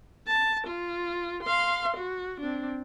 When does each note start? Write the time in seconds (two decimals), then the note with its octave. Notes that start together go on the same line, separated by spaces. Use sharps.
0.27 A5
0.67 F4
1.43 F5 C6
1.97 F#4
2.40 C4 D4